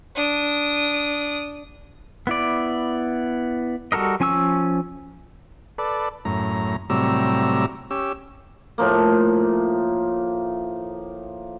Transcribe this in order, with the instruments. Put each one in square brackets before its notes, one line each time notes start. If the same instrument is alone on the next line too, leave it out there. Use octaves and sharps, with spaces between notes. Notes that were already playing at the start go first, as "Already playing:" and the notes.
[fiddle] D4 D#6
[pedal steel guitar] B3 E4 D5
G3 F#4 A4 A#4 D#5
F3 C#4 G#5 C#6 E6
[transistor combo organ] A4 B4 D5
F#2 A2 A#5
A2 C3 F#3 G3 A#5 E6
C#4 G4 E6
[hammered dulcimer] A2 F3 A#3